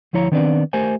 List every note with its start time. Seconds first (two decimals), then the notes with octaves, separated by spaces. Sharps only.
0.13 D2 F3 E4 C#5 A#5
0.32 D#3 B3 C4 D4 B4 D5
0.73 A3 G4 A#4 C5 G#5